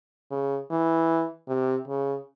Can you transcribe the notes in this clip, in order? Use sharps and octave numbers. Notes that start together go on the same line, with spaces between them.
C#3
E3
C3
C#3